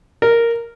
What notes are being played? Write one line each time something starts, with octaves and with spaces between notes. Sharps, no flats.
A#4